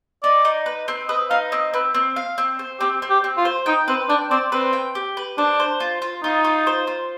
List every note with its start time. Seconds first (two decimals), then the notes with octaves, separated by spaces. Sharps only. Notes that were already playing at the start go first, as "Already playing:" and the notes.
0.23 D#4 D5
0.45 D#4
0.66 B4
0.88 C4
1.09 B4 D#5
1.30 D#4 F5
1.52 C4 D#5
1.74 C4 B4
1.94 C4
2.16 F5
2.38 C4
2.59 C5
2.80 C4 G4
3.02 C4
3.10 G4
3.24 C4
3.37 F4
3.45 C5
3.66 D#4 G5
3.88 C4 B4
4.09 D4 G5
4.30 C4 D5
4.52 C4 B4
4.73 G5
4.95 G4
5.17 B4
5.38 D4 C5
5.60 C5
5.80 F4
6.02 F4
6.23 D#4 F4
6.44 F4
6.67 C5
6.87 F4